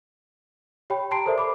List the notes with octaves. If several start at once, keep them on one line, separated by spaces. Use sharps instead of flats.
G4 C#5 G5 B5
G5 A5 A#5 C6 C7 D7
A4 A#4 C5 D5 E5
B5 D6